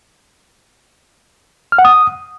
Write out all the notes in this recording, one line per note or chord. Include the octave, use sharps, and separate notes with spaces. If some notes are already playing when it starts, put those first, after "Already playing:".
F6
F#5
D#6